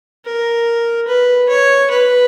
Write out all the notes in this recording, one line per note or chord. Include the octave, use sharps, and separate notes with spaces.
A#4
B4
C#5
B4